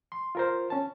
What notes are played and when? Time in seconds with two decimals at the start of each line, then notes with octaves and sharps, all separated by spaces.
0.12 C6
0.35 F4 A#4 C5
0.70 C#4 A5